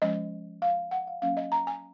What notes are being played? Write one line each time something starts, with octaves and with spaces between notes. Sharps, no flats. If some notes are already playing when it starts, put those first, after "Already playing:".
F3 G#3 C#4 D#5
F5
F#5
F5
F#3 A#3 C#4 F5
D#5
A#5
G#5